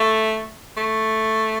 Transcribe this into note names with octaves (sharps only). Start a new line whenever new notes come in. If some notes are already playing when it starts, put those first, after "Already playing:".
Already playing: A3
A3